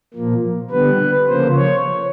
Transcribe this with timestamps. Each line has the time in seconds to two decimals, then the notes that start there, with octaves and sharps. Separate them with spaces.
0.14 A#2 F3 A#3
0.70 D3 G3 B3 B4
1.28 C#3 F3 A#3 C5
1.56 C#5